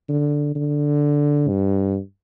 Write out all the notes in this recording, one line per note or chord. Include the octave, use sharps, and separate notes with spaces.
D3
D3
G2